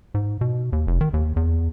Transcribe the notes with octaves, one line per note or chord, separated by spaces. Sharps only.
G#2
B2
D#2
F1
D#3
D#2
E2